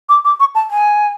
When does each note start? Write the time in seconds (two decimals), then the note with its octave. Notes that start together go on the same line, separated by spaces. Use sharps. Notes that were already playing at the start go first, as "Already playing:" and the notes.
0.09 D6
0.25 D6
0.40 C#6
0.55 A5
0.71 G#5